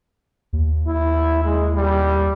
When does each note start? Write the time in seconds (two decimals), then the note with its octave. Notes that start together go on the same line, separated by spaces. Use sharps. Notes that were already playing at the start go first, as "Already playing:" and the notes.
0.53 D#2
0.87 E4
1.45 G#3
1.75 G3